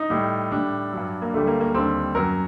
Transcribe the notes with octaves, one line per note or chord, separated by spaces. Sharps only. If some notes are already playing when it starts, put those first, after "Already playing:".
Already playing: D#4
A2 G3
A2 G3 D4
G2 F#3
A#3
D2 D3 G3 A3
A#3
A#3
D#2 D3 G3 C4
F#2 F#3 A#4